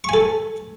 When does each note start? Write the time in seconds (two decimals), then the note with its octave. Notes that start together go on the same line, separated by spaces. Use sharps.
0.04 C#6
0.09 G#5
0.13 A4